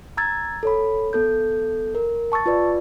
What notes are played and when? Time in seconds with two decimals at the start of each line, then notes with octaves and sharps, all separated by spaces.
0.17 A#5 E6 G#6 A6
0.63 A4 C#5 B5
1.13 B3 A4 G6
1.95 A#4
2.32 A5 C#6 E6 A6
2.46 F4 B4 D5